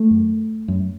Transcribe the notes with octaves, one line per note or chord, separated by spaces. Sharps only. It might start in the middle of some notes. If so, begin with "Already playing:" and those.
Already playing: A3
F#2
F#2